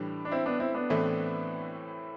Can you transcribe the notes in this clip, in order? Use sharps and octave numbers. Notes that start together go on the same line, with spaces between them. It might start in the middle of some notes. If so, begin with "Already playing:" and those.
Already playing: A2 E3 G3 D4
D4
C4 E4
B3 D4
C4 E4
B3 D4
A2 E3 A3 C4 E4